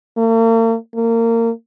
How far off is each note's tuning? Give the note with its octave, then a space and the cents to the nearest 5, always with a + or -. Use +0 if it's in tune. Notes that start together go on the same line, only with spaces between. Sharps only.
A#3 -45
A#3 -25